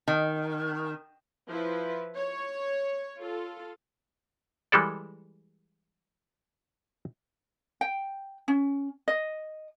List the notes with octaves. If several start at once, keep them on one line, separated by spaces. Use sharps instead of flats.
D#3
F3 E4 B4
C#5
F4 A4
E3 G3 G#3 A4 D5
G5
C#4
D#5